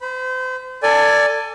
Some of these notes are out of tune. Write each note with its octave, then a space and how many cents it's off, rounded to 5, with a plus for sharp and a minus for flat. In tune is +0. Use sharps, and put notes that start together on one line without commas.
C5 -35 B5 +0
A4 +30 D5 +0 G#5 +0